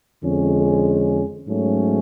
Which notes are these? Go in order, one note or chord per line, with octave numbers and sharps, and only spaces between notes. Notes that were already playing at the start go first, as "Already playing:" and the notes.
F2 D3 G#3 C#4
G#2 F#3 A3 C#4